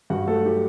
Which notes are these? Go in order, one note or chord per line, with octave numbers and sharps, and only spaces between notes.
G2 F#4 F#5
F#3 A3 A4
F#3 G4